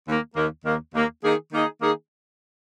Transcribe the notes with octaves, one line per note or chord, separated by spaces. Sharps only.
D#2 D#3 A#3
D#2 D#3 A#3
D#2 D#3 A#3
D#2 D#3 A#3
D#3 A#3 D#4 G#4
D#3 A#3 D#4 G#4
D#3 A#3 D#4 G#4